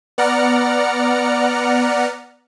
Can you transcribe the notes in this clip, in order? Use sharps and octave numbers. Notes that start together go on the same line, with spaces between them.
B3 D5 F#5 A#5 F6 C#7